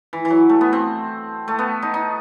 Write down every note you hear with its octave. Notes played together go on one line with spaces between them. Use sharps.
E3
E3
F#3
A3
B3
C4
A3
B3
D#4
D#4